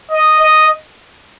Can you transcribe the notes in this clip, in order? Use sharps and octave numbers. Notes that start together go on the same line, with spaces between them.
D#5
D#5